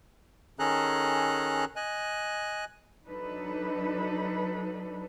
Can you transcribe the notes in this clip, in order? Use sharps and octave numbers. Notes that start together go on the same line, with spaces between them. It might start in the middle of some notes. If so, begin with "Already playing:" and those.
D#3 C#4 G#4 A4 A#5 F#6
D#5 G#5 F#6
F#3 D4 D#4 A4 B4